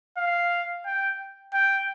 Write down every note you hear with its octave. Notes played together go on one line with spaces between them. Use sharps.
F5
G5
G5